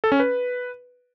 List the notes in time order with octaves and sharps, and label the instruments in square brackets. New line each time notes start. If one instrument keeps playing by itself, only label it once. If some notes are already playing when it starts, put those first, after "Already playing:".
[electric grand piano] A4
C#4
B4